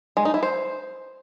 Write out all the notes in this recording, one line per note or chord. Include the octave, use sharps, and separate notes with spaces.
G#3
D#4
E4
C5